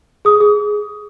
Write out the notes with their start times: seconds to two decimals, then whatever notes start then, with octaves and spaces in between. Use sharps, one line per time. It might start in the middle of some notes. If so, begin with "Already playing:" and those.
0.25 G#4 D#6
0.41 G#4